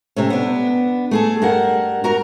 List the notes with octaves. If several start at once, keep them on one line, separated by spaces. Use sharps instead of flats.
C3 A3 C#4
B3 D4
A3 G#4 A4
G2 A#4 F#5
F#4 A#4 F#5 A#5